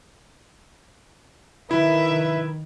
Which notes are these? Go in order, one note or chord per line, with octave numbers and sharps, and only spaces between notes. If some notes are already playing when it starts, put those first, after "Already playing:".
D#3 E4 B4 E5